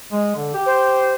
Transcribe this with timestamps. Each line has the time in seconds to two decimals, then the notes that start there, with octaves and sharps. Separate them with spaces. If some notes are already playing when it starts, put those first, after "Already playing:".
0.12 G#3
0.35 D3
0.54 G4
0.66 C5